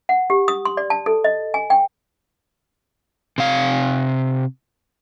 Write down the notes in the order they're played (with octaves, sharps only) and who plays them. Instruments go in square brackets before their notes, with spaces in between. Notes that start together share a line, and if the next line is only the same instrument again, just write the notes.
[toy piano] F#5
G4
D#6
C6
D5
A5
A4
D#5
G#5
G5
[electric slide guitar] C3 F5